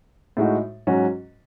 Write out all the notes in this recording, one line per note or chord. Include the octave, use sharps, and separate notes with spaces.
A2 G#3 D#4 F#4
G#2 F#3 C#4 F#4